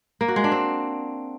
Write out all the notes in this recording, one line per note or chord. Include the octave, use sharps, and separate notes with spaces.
A#3
F#4
G#3
D4
C4